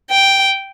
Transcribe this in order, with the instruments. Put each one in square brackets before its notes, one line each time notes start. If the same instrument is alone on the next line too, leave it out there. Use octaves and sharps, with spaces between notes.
[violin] G5